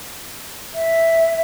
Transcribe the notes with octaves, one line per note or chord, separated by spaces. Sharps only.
E5